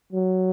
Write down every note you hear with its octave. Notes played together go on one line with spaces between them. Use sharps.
F#3